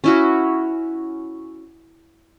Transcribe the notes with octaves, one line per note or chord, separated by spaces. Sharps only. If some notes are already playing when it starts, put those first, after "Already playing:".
C#4 E4 F#4